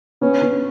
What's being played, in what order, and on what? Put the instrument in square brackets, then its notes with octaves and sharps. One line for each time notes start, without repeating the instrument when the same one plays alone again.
[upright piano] B3 [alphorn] C#4
[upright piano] B3